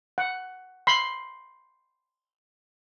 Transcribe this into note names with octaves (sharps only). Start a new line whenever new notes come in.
F#5
B5 C6